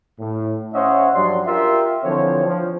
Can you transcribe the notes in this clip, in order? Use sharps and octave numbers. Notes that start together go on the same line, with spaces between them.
A2
C#4 C5 C#5 D#5 E5 F#5
G2 F3 F#3 D5 C6
F4 G4 A#4 E5
D3 E3 F3 C4 C#5
F3